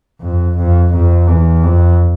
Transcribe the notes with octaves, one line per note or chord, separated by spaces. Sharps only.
F2
F2
F2
E2
F2